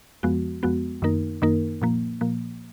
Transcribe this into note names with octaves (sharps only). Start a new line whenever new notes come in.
F2 F3 G#3 B3 F#4
F2 F3 G#3 B3 F#4
F#2 D#3 A#3 D#4 A#4
F#2 D#3 A#3 D#4 A#4
A#2 F3 A#3
A#2 F3 A#3